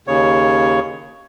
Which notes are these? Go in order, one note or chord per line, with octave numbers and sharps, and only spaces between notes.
D#2 C#3 C#5